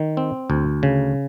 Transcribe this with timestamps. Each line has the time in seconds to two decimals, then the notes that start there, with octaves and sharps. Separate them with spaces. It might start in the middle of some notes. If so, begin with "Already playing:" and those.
Already playing: D#3
0.17 C4
0.50 D2
0.83 C#3